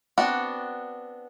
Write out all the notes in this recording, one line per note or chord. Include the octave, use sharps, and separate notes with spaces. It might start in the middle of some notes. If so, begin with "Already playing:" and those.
B3 C4 D4 F#4 F#5